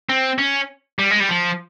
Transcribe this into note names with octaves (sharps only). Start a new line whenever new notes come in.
C4
C#4
G3
G#3
G3
F3